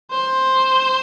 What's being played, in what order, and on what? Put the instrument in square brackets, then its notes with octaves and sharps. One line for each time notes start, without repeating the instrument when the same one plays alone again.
[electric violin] C5